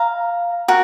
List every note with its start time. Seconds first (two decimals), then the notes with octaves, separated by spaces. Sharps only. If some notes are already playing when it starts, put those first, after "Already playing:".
Already playing: F5 A#5
0.68 F#4 A#4